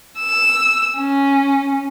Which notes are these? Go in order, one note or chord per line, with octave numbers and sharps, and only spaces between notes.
E6
C#4